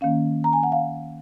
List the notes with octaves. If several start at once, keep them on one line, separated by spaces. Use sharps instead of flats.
D#3 A#3 C#4 F5
A#5
G#5
F#5
F5